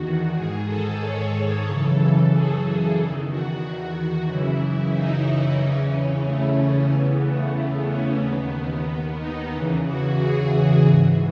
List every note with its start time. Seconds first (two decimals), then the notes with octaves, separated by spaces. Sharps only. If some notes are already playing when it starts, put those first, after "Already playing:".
Already playing: E2 D#3 F#4
0.33 G#2 D#3 G#4
0.66 A4
0.99 C#5
1.31 A4
1.65 F#2 C#3 E3
1.97 A4
2.31 G#4
2.96 E2 D#3
3.28 F#4
4.27 F#2 C#3 E3 E4
4.60 E4
4.92 D#4
5.25 D#4
5.58 E2 C#3 E3 C#4
5.91 C#4
6.24 A3
6.89 E2 C#3 E3 B3
7.21 A3
7.88 C#4
8.20 D#2 D#3 B3
9.19 D#4
9.51 E2 C#3 E3
9.84 F#4
10.16 G#4
10.83 G#2 E3